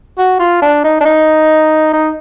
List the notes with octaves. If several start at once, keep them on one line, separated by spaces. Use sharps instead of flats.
F#4
F4
D4
D#4
D4
D#4
D#4